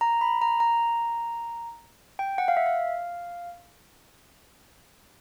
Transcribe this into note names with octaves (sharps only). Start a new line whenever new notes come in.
A#5
B5
A#5
A#5
G5
F#5
F5
E5
F5